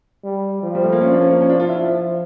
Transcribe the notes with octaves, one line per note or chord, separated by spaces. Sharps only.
G3
F3
G3
A3
A#3
C#4
D4
C#4
A#3
C#4
D4
F4
E4
F3